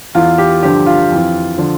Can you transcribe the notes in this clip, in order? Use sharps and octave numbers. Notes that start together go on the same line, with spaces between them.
E2 E3 F4
G4
G2 D3 F3 G4
F4
F2 E3
D3 F3